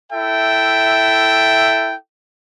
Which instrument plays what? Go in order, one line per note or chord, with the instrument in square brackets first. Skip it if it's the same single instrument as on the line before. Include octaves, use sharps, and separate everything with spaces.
[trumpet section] E4 A4 E5 G5